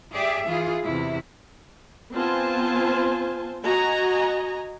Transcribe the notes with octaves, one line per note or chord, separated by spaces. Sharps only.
G4 G#4 D5 E5
E3 F4 G#4
E2 C3 E4
B3 C4 F4 C5 G#5 A5
F#4 D#5 G#5 A#5